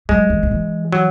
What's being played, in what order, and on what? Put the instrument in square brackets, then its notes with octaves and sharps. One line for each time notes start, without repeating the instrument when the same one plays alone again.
[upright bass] F#3 [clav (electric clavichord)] G#3
[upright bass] E3
D#3
E3
[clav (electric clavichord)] F#3